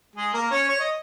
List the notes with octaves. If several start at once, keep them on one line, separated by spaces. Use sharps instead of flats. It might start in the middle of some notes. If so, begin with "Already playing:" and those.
G#3 G#4
A#3 A#4
C#4 C#5
C#5
D#5